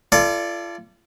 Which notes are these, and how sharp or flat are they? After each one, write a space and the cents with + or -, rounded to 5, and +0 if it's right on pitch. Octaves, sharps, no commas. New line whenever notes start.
F4 -35 A4 +0 D5 +0